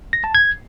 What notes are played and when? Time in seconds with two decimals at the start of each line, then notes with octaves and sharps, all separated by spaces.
0.13 A#6
0.24 A5
0.35 G#6